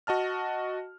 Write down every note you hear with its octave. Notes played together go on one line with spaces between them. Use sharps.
F#4 D#5 A5 F6